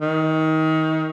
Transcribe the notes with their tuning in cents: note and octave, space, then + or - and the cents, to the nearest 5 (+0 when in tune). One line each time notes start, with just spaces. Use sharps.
D#3 +25